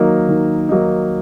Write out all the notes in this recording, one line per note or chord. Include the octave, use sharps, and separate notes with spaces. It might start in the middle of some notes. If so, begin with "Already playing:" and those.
Already playing: D#3 F#3 A#3 D#4
D#3
F#3 A#3 D#4